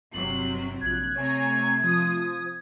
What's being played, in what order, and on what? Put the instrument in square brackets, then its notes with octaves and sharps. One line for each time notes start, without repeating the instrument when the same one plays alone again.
[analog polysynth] G1 [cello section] C3 F#3 C4 [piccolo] F#7
[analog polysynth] A#1 F#6 [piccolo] G#6
[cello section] C3 A3 C4 [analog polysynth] C#5 G#5 A#5
[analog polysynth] F3 D#6